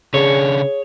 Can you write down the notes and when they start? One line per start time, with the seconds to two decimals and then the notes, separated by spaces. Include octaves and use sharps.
0.14 C#3 D4 G#4 C#5